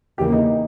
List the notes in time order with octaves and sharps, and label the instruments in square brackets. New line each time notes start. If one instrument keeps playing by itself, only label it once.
[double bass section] E2 C#3 E3 A#3 [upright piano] G4
[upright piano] D#4
D#4